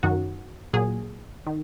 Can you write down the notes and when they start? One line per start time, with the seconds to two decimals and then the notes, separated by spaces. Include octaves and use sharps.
0.03 F#2 D#3 F#3 F#4
0.73 A#2 F#3 G#4
1.47 D#3